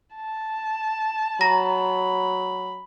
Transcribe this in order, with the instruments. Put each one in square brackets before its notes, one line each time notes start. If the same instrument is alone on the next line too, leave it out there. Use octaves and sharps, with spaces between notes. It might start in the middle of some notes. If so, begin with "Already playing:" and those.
[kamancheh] A5
[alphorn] F#3 [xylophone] A#5 A#6 [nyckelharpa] B5